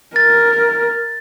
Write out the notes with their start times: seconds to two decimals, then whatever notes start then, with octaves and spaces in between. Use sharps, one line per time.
0.16 A#4 A6